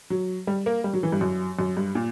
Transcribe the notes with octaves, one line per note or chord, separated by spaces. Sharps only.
F#3
G3
A#3
G3
F#3
E3
G2
F#2
F#2
G2
A#2